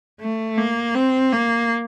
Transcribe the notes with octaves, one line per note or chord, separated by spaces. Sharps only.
A3
A#3
C4
A#3